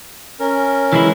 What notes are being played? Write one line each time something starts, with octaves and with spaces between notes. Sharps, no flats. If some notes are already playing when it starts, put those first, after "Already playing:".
C#4 A#4
E3 G#3 E4